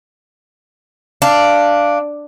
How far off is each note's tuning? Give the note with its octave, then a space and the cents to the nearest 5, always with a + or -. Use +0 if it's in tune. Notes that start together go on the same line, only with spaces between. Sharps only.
D4 +0 F5 -15